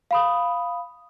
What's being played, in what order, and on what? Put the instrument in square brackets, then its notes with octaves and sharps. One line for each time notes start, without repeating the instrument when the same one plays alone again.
[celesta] F5 B5 D#6